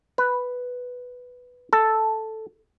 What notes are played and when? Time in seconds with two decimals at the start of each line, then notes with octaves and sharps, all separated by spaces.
0.18 B4
1.73 A4